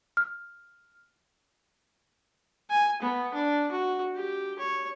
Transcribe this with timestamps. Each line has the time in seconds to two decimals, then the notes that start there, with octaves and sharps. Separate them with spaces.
0.17 F6
2.70 G#5
3.02 B3
3.34 D4
3.71 F#4
4.15 G4
4.59 C#5